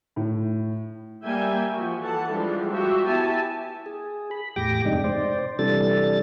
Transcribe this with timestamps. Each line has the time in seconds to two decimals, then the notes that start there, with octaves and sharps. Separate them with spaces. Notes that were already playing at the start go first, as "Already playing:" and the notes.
0.16 A2
1.24 G3 A#3 E5 G5 G#5
1.73 F3 F#4
2.03 E3 A4 F#5 A5
2.31 E3 F3 G3 G#3 D4
2.70 F3 F#4 G4 E5
3.07 B3 E4 G4 G#5 A5
3.86 G#4
4.31 B5
4.56 E2 A2 G4 G5 D6 A#6
4.85 F2 G#2 C3 G#3 D4 D#4
5.04 C5 D5
5.59 C3 E3 G3 D4 A4 A6